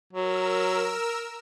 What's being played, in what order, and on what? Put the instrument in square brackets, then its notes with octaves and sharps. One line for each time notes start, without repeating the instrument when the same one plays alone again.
[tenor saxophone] F#3 [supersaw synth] A#4 E6